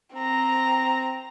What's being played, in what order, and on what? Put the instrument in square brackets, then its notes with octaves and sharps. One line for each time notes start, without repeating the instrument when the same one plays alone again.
[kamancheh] C4 A#5